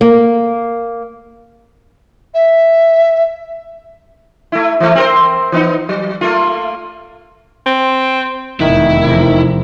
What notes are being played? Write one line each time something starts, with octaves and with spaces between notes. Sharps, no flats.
A#3
E5
A3 E4
E3 A3
C4 A#4 C5
E3 B3 D#4
F#3
A3 A#3 F4
C4
F1 E2 D#3 E4 D#6 F#6 B6
C3 F3 A#4